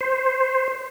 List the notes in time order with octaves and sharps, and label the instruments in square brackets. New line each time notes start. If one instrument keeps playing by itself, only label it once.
[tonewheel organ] C5